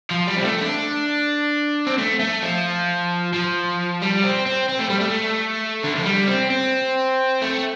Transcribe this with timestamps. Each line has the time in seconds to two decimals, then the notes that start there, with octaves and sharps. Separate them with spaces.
0.11 F3
0.27 G3
0.37 C4
0.44 A3
0.61 D4
1.87 C4
1.98 A3
2.20 A3
2.42 F3
3.33 F3
4.02 G3
4.24 C4
4.46 C4
4.69 C4
4.80 A3
4.90 G3
5.01 A3
5.84 D3
5.95 F3
6.05 G3
6.27 C4
6.50 C4
7.42 A3